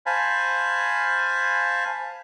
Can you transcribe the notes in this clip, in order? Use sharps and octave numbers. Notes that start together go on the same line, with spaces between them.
C5 F5 G#5 A5 B5